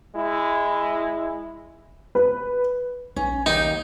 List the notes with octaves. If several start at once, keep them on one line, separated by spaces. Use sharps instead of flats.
G#3 E4
B4
A#1 C#4
D#2 D#4 G5